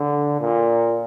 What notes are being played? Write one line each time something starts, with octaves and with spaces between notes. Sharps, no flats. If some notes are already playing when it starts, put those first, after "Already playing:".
Already playing: D3
A#2